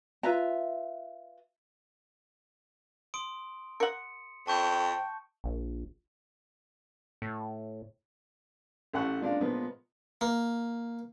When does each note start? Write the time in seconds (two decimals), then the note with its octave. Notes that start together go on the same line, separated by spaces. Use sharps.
0.23 F4 B4 E5 A#5
3.14 C6 D#6 D7
3.80 A#4 F#5 C#7
4.47 F2 G5 A5 C#6 G6
5.44 A#1
7.22 A2
8.94 A1 G4 A4 F#5 C#6 F#6
9.21 A#2 G#3 D4 F5
9.41 A#2 F3 G#3 B3
10.21 A#3